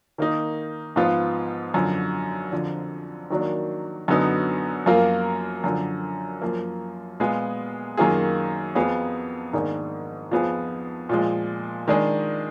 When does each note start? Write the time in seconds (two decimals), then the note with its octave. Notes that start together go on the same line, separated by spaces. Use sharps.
0.18 D#3 A#3 D#4
0.96 G#2 F3 B3 F4
1.74 F#2 D3 F3
2.52 F2 D3 F3
3.30 D#3 F#3 A#3 D4
4.08 F#2 D3 F#3 B3 D#4
4.86 F#2 F3 A#3 F4 A#4
5.64 F#2 D3 F3
6.41 F#2 F3 A#3
7.20 A#2 G#3 B3 F4 G#4
7.97 F#2 D#3 A#3 F4 G#4
8.75 F2 F3 B3 F4 G#4
9.53 G#2 D#3 A#3 D4 G#4
10.31 F2 F3 B3 F4 G#4
11.09 A#2 F3 G#3
11.88 D#3 G#3 D4 G#4